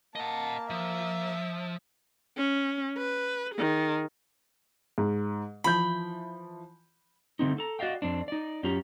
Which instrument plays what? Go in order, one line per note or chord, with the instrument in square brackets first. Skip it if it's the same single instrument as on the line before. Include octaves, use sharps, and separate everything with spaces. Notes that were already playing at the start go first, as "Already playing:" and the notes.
[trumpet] A#3 [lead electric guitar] D#5 F#5 [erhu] A5
[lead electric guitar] F3 [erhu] E5
[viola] C#4
B4
D#3 G#4
[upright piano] G#2
[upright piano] E3 F3 G6 [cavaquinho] B5
[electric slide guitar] D3 A3 C4 D#4
A4 A#5
F#4 D5 D#5 F5 G5
F2 C4 D4
D#4 D5
F#2 C#4 F4 G4 A#5